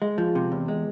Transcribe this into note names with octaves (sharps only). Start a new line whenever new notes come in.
G#3
F3
C3
E2
G#3